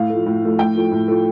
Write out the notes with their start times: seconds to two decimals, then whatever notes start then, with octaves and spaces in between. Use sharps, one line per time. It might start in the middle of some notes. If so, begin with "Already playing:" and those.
Already playing: A2 F5
0.09 F3 A3
0.26 A2
0.42 F3 A3
0.58 A2 G5
0.75 F3 A3
0.91 A2
1.08 F3 A3